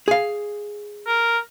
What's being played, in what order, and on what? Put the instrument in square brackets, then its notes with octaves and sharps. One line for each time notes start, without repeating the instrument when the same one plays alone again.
[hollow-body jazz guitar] G#4 F5
[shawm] A#4